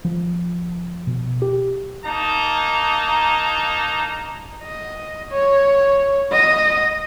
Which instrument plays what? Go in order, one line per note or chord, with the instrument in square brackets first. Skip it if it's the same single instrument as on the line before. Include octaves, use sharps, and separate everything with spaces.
[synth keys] F3
B2
G4
[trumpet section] A#3 D#4 A5 A#5
[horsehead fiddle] D#5
C#5
D#5